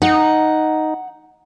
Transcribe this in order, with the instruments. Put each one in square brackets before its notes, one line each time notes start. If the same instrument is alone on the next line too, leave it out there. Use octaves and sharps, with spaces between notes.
[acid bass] D#4 [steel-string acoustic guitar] F#5